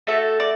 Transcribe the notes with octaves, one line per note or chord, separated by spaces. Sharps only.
A3 F#4 A4 E5
D5